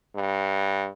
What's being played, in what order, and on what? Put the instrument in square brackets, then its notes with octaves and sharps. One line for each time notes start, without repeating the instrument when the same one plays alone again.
[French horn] G2